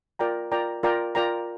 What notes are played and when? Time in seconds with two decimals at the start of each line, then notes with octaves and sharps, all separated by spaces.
0.19 F4 A#4 D5 G5 A#5
0.52 F4 A#4 D5 G5 A#5
0.83 F4 A#4 D5 G5 A#5
1.15 F4 A#4 D5 G5 A#5